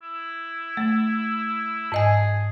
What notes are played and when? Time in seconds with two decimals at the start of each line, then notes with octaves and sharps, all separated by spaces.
0.03 E4
0.77 A3
1.92 G#2 G#4 D#5 G#5